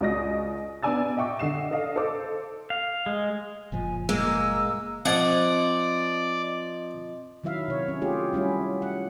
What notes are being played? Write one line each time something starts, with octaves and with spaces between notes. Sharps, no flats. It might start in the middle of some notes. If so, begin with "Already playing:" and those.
C#2 F#4 D5 D#5 D#6 A#6
B3 D4 D5 G#5 E6 A6
D#5 E5 G5 C#6 D6
D3 D#5 C7 E7
A4 D5 D#5 F5
A4 C5 D6
F5
G#3
F#1 A#2 F3 G#5
G#3 A#3 E6
F3 C4 D5 D#5 F#5
D#3 F#3 E4 E5 F5
C3 C#5
C#4
A3 F4 G4 G#4
G3 C#4 E4 F#4
F#5